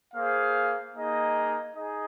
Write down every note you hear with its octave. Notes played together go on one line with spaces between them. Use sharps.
A#3 G#4 C5 F5
A#3 D#4 G#4 D#5
D#4 G#4 D#5